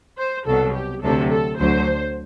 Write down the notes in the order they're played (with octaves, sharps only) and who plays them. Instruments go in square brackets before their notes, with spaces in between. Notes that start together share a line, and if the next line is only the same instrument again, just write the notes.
[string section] C5
C2 B2 F#3 A4
G4
D2 C3 F#3 A4
A4
D2 D3 F#3 C5